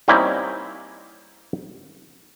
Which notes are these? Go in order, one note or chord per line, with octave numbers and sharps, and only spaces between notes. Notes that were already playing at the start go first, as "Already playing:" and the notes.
G3 A#3 C4 C#4 D#4 E4